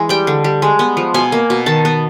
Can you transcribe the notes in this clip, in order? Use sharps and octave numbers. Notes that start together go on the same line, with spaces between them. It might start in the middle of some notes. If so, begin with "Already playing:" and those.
Already playing: E3 G#3
G3 G5
D3
G3
G#3
B3
F3
B2 G#5
A#3
B2
D#3 A5
B3